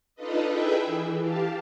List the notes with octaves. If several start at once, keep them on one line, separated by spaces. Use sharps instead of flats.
D4 D#4 F4 A4 B4 D#5
E4 G#4 B4 E5 G5
E3
G4 F5 A5